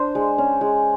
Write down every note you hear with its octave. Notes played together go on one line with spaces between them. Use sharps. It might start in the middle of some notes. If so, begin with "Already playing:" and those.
Already playing: D4 C5
G#3
C#4
G#3